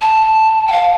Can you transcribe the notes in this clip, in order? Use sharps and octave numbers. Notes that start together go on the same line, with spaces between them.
A5
G5
F5